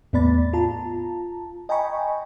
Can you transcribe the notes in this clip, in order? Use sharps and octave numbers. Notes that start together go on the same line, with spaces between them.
E2 A2 B3 D5 B5 A6
F4 A5 A#5
D#5 G5 G#5 A#5 B5 C#6